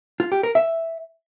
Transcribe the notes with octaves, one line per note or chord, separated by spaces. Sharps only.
F4
G4
A#4
E5